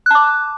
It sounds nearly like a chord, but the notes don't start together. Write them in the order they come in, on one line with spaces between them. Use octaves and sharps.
F#6 A5 D6